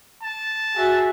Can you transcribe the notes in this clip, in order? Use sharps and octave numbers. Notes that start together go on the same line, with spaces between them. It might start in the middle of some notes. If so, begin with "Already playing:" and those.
A5
F#4 G#4 E5